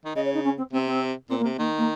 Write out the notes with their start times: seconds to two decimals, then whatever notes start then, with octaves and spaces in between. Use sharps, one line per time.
0.05 D#3
0.15 C#3 D#5
0.25 C#5
0.34 D#4
0.44 C#4
0.57 C4
0.72 C3 C4
0.87 C4
1.30 A#2 C4
1.39 A#3
1.44 C3
1.58 D#3 A#3
1.78 A#3